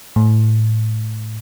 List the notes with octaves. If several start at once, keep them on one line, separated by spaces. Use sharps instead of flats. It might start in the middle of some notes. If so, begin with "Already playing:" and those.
A2